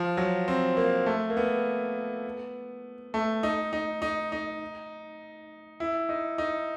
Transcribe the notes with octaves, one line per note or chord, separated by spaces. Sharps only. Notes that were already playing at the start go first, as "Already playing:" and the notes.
Already playing: F3
F#3
C4
A#3
A3
A#3
B3
A3
D#4
D#4
D#4
D#4
E4
D#4
D#4